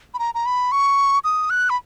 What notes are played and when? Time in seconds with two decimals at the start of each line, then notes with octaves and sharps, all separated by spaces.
0.14 B5
0.19 A#5
0.35 A#5
0.46 B5
0.72 C#6
1.24 D#6
1.50 F#6
1.70 B5